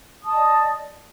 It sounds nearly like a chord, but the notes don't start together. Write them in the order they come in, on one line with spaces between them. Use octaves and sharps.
D#6 A5 D#5 D5